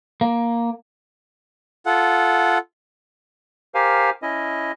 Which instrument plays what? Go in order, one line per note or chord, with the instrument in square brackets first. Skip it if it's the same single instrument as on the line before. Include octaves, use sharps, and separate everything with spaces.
[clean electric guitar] A#3
[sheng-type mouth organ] F4 A4 F#5
[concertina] G4 A#4 C5 F5 G#5
C#4 E4 D#5